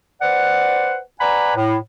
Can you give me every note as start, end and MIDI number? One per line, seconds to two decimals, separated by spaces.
0.22 0.98 71
0.22 0.98 72
0.22 0.98 74
0.22 0.98 78
1.20 1.56 71
1.20 1.56 74
1.20 1.56 78
1.20 1.56 80
1.20 1.56 82
1.20 1.56 83
1.56 1.77 45